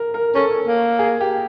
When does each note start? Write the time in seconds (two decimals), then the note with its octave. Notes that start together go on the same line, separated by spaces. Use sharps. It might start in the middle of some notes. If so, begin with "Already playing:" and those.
Already playing: A#4
0.14 A#4
0.35 C#4 A4
0.67 A#3
0.99 G#4
1.21 G4